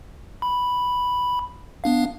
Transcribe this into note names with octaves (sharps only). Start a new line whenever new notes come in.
B5
B3 D4 F5